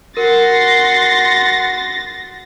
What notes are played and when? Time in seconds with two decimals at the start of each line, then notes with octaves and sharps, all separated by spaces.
0.17 F#4 A#4 C6 A6 A#6